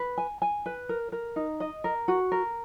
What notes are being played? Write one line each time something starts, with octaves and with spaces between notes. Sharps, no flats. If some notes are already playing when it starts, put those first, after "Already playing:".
Already playing: B4
G#5
G#5
B4
A#4
A#4
D#4
D#5
A#4
F#4
A#4